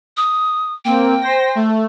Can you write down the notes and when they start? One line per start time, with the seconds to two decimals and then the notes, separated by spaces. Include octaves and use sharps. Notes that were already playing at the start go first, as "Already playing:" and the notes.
0.17 D#6
0.85 A#3 C4 G5
1.21 C5 A#6
1.55 A3